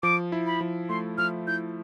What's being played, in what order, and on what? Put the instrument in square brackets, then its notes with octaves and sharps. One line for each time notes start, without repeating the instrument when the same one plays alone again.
[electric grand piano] F3 [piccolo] D6
[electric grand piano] E4
[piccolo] B5
[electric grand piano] F3
[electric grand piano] A3 [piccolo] C6
[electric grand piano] F3 [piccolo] F6
[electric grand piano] E4 [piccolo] G6